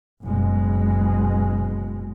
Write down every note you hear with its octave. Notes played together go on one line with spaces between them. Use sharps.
F#1 B2 G#3